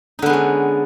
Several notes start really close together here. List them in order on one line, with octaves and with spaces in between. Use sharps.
D#4 D3 B3 G#3 C#4